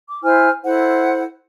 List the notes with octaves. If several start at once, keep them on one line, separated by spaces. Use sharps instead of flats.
D6
E4 C5 G#5 F6
E4 A4 C5 F#5